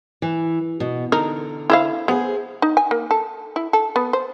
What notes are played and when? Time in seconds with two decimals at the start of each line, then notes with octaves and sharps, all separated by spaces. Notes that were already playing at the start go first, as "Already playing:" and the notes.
0.22 E3
0.80 B2
1.12 D3 D#4 A#4
1.70 E4 C5 F5
2.08 B3 G#4 C5
2.62 D#4
2.77 G#5
2.91 A#3
3.11 A4
3.56 E4
3.73 A4
3.96 B3
4.13 C5